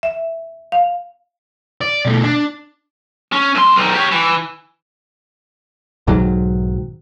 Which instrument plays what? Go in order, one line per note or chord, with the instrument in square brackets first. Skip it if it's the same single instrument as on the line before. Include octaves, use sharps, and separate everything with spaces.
[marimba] E5
F5
[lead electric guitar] D5
B2 A3
D4
C#4
F#2 C6
B1 D#3
G4 C#5
E3
[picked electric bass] B1 G#2 D#3 F#3